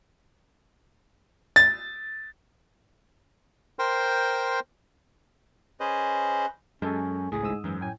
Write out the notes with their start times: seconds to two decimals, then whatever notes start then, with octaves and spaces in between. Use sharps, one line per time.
1.56 A6
3.79 A#4 C5 G5 C6
5.80 C#4 G#4 B4 C5 D#5
6.82 F#2 G#3 C#4 A4 G#5
7.32 G#1 C#2 A2 G#4
7.43 G#2 D#6 E6
7.64 F#2 E3
7.81 A2 G5 G#5